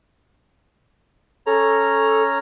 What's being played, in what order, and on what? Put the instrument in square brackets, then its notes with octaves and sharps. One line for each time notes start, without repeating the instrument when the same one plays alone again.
[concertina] C#4 C#5 A#5 [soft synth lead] A4